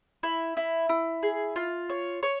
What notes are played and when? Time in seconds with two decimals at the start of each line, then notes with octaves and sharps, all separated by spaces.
0.23 E4
0.57 E4
0.89 E4
1.23 G#4
1.56 F4
1.89 C#5
2.23 C#5